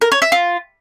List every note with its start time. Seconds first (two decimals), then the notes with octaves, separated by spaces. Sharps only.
0.01 A#4
0.12 C#5
0.22 E5
0.32 F4